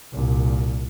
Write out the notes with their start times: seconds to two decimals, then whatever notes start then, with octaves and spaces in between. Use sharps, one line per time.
0.13 C2 A#2